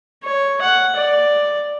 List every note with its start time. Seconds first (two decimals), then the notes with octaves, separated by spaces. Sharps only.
0.23 C#5
0.62 F#5
0.96 D5